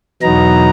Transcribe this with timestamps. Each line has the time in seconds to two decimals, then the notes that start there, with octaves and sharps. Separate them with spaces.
0.22 E2 B2 F#3 B3 D#4 A#5